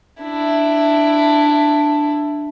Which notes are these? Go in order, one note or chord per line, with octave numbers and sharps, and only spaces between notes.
D4 E4